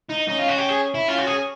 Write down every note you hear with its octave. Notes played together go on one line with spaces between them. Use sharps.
D#4
C#4 D#4
F4
F#4
G4
G#4
E4
C#4 F4
F#4
G#4